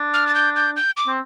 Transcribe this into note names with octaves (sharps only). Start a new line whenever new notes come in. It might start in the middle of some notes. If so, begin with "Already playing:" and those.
Already playing: D4
F6
A6
G6
G6
G6
D6
C4